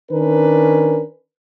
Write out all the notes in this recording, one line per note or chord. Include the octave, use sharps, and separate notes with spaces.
D#3 C#4 D4 A#4 B4